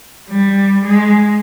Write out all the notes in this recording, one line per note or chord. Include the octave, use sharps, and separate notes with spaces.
G3
G#3